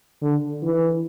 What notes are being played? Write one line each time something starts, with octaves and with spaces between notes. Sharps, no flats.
D3
E3